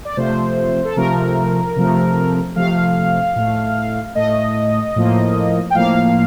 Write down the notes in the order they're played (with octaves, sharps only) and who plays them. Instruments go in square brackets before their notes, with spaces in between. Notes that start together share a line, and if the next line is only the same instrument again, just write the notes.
[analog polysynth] D5
C3 F3 A3 C5
A4
C3 F3 A3 A#4
C3 F3 A3
C3 F3 A3 F5
A2 A3
A2 A3 D#5
A2 F3 A#3
G5
A2 F3 A#3 F5